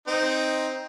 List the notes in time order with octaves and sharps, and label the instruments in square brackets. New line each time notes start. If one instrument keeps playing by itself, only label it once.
[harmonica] C4 D#4